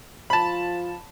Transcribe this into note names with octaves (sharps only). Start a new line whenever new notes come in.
F3 F4 A5 B5